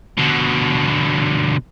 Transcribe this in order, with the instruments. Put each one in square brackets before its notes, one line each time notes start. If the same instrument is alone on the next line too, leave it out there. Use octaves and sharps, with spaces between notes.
[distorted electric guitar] B2 D3